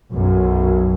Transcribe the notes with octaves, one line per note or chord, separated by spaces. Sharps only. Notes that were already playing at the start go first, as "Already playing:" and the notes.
B1 F#2